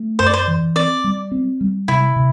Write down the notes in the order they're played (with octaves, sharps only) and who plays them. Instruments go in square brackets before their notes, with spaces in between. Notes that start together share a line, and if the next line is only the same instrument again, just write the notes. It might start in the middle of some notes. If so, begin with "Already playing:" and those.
Already playing: [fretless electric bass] A3
[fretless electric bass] F#2 [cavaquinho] C5
[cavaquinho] D5
C5
[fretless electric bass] E3
[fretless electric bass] C4 [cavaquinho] D5
[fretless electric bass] G3
C4
G3
[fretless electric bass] C3 [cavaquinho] E4
[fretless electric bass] C3